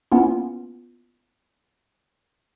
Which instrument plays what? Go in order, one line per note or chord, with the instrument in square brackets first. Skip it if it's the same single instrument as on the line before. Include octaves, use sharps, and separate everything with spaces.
[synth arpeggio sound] A#3 B3 C#4 E4 F4